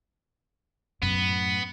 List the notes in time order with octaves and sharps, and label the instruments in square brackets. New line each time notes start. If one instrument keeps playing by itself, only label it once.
[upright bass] F#2 A2 [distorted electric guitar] B3